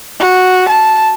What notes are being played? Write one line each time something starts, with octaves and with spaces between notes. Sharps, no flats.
F#4
A5